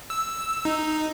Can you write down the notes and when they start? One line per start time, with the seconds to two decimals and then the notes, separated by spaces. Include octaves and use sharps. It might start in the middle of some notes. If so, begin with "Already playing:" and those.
0.10 E6
0.65 D#4